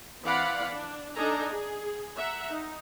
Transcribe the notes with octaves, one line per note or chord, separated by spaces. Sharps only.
E3 C4 D5 F5 F#5 B5
D4
D4 D#4 A4 D#5 G#5 A#5
G#4
E5 F#5 A#5
D#4